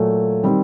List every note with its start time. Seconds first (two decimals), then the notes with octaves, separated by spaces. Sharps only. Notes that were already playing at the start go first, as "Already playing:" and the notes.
Already playing: A#2 F#3 A3
0.43 D#3 G3 C4